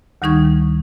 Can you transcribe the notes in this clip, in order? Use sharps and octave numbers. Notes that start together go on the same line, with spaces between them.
D2 D#3 G3 D#4 C#6 G#6